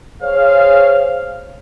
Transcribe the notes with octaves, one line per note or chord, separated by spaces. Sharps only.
G#4 C5 C#5 F5